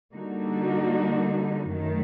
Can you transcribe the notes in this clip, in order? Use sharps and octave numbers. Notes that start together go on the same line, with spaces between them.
D3 G3 A#3 D#4 F#4
F#2 D#3 F#3 A3